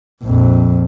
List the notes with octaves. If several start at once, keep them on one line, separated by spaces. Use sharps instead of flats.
A#1 F2